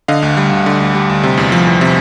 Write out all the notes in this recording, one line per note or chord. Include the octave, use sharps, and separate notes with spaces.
D3 D#5 F5
D2
G3
D2
D3
D2
G3
D2
C3
E2
F3
E2
C3